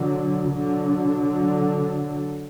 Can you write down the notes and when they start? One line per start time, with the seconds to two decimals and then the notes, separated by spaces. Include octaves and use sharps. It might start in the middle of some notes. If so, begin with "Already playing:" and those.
Already playing: D3 F#3
0.52 D3 F#3